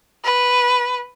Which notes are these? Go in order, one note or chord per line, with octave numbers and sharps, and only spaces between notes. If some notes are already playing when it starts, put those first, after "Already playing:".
B4